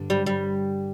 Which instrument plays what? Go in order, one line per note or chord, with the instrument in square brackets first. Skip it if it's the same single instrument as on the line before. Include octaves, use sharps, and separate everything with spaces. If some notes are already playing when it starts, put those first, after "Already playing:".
Already playing: [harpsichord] G2 D3
[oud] G3
G3